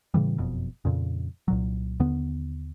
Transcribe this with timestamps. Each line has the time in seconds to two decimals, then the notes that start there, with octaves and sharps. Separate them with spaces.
0.14 A2 C#3 E3 G3
0.38 F#1 F2 B2
0.85 F2 A#2 C#3
1.48 C2 A#2 F#3
2.00 D#2 D3 B3